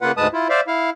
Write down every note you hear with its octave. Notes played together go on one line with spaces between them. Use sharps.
C#3 A#3 F4 B4 F#5
D2 G#2 G#3 B4 A5 D#6
E4 F4
C5 D5 E5 F5
E4 F5